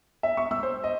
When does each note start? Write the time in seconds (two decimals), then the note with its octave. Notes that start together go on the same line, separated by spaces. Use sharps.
0.23 E5
0.37 C#6
0.51 E6
0.63 C5
0.84 D#5